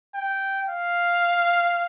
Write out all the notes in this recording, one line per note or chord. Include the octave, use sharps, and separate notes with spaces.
G5
F5